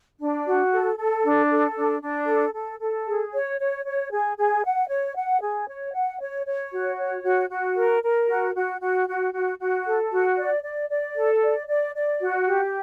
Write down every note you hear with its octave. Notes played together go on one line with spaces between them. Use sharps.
D4
F#4
A4
A4
D4
A4
D4
D4
A4
A4
A4
G#4
C#5
C#5
C#5
G#4
G#4
F#5
C#5
F#5
G#4
C#5
F#5
C#5
C#5
F#4
C#5
F#4
F#4
A#4
A#4
F#4
F#4
F#4
F#4
F#4
F#4
A4
F#4
D5
D5
D5
A4
D5
D5
D5
F#4
G4